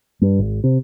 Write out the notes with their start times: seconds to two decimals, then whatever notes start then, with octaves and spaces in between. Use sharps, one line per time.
0.21 G2
0.39 G#1
0.64 C3